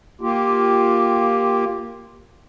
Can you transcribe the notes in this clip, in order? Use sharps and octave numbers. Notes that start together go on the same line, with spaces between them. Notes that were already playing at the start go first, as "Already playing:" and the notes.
A#3 F4 G4